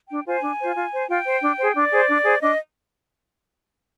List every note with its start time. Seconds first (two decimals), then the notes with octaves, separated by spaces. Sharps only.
0.08 D4 G5
0.25 F4 C5 G#5
0.42 D4
0.59 F4 C5
0.75 F4
0.92 C5
1.08 F4 G5
1.25 C5
1.41 D4
1.58 G#4 C5
1.75 D4 D5
1.91 G#4 C5
2.08 D4
2.24 G#4 C5
2.41 D4 D#5